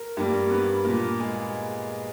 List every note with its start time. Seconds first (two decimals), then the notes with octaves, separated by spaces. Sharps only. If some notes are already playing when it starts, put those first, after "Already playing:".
Already playing: A#4
0.17 G2 G3 A#3
0.50 B3 B4
0.85 A#2 A#3
1.20 G#3 G#4